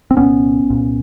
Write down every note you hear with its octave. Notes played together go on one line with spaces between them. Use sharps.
C4
C2 A#2 B3 C#4
C2 A#2